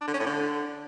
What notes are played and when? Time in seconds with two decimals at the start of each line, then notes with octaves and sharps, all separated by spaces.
0.01 D4
0.07 D3
0.13 C#4
0.20 A2
0.26 D3